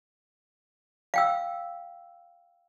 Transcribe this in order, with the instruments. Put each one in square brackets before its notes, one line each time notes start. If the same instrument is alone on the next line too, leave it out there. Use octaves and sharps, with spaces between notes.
[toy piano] F5 G5 E6